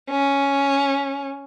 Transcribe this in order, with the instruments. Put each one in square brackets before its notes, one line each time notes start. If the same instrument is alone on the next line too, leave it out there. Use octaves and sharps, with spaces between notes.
[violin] C#4